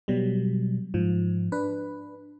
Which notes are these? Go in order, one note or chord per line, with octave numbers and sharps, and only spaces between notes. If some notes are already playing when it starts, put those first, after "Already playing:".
B2 F#3 G3
G#2 F3
D4 B4